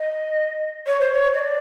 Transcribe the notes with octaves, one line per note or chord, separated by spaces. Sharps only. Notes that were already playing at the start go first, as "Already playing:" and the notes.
Already playing: D#5
C#5
C5
C#5
D#5
D5